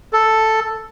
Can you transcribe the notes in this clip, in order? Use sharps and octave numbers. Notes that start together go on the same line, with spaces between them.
A4